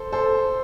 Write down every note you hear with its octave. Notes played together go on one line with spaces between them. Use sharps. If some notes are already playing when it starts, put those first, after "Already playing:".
Already playing: A4 C5
A4 C5